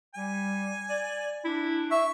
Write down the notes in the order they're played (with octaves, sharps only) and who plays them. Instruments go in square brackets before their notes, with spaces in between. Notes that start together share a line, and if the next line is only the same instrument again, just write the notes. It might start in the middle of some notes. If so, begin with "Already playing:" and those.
[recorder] G3 [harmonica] G#5
[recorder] D5
[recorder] D4 [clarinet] E4
[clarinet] E5 [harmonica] C#6